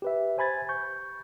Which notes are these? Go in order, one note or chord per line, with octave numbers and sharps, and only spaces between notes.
G4 B4 E5
C5 G#5 B5 G#6 A6
C#6 G6